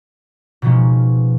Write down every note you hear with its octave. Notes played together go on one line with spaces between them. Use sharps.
B2 D#3 F3 G#3 C#4